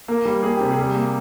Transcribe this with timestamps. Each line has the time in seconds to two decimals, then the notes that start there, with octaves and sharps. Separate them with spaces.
0.08 A#3 A#4
0.25 G3
0.43 A#3 G#4
0.57 C3 G4
0.71 G#4
0.79 G3
0.96 A#3